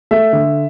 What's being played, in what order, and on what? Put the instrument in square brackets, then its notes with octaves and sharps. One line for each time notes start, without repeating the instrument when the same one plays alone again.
[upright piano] A3 E5
D3